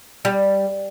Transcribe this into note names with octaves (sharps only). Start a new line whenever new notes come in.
G3